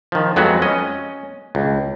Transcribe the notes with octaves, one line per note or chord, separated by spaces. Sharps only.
D#3 F3
F2 F#3 G#3 B3 F#4
C#4 D#5
C#2